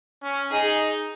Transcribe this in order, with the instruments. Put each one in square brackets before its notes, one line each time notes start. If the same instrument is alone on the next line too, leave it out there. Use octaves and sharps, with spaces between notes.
[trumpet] C#4
[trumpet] D#4 [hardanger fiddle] G#4